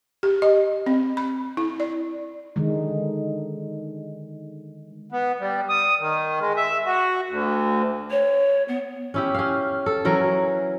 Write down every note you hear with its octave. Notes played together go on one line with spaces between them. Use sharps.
G4
D#5
C4
B5
E4
D5
D3 D#3 G#3
B3
G3
D#6
D#3
G#3
E5
F#4
D2
C#5
B3
C#4 E4 G4
C#4 F5
A4
E3 F#3 C#4 A#4